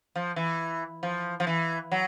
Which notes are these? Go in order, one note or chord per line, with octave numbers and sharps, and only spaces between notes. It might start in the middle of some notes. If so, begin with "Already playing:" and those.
F3
E3
F3
F3
E3
F#3